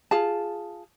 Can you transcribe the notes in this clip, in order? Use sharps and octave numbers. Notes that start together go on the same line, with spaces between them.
F4 G#4 A5